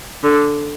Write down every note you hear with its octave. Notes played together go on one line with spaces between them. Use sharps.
D3